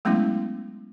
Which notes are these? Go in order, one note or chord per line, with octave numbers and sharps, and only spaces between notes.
F#3 G#3 A3 B3 C#4 E4